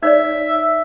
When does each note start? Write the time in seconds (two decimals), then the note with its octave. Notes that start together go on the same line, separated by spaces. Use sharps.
0.03 D#4 C#5 D5 E5